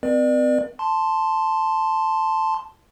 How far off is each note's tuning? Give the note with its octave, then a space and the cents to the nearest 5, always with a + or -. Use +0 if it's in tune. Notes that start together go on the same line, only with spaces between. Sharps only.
C4 -35 B4 -45 D5 +30
A5 +0 C6 +0